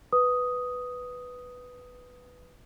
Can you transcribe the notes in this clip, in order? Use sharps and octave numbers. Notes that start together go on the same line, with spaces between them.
B4 D#6